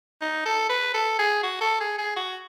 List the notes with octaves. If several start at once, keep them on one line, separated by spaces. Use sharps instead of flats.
D#4
A4
B4
A4
G#4
F#4
A4
G#4
G#4
F#4